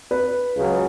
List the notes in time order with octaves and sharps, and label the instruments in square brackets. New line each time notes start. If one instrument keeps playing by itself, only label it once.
[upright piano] B4
[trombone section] C#2 C#3 F#3